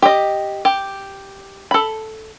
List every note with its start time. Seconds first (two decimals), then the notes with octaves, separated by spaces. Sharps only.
0.02 G4 D#5
0.65 G4
1.71 A4 B5